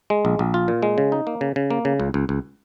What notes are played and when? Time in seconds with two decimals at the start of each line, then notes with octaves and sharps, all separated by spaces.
0.10 G#3
0.25 A#1
0.39 A#1
0.54 F4
0.68 A#2
0.83 G#3
0.98 C#3
1.12 D#4
1.27 A#3
1.41 C#3
1.56 C#3
1.71 A#3
1.85 C#3
2.00 C#2
2.14 C#2
2.29 C#2